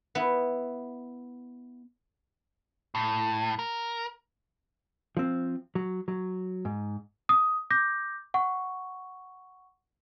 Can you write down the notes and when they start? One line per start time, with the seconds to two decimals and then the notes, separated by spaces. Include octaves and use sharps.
0.15 B3 E4
2.95 A2
3.59 A#4
5.17 F3 C4
5.75 F#3
6.08 F#3
6.65 G#2
7.29 D#6
7.70 D6 G6 A#6
8.34 F#5 C#6